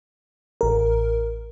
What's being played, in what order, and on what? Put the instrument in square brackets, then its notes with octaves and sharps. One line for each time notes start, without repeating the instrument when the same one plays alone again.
[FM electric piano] A1 A#4